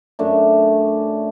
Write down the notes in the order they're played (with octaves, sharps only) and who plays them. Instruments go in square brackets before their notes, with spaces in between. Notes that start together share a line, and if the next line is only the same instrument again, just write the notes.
[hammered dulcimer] F#2 A3 D4